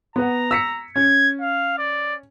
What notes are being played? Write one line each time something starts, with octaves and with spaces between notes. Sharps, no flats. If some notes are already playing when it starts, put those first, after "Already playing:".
B3 F#5 A#5
E6 B6 C#7
C#4 G#6
F5
D5